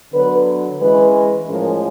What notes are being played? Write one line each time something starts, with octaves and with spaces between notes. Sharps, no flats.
D3 F#3 B3 B4
E3 G#3 C#4 B4
A2 F3 G#3 C#4 A#4